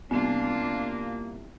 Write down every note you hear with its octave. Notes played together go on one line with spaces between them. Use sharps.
C2 A#3 B3 D4 F4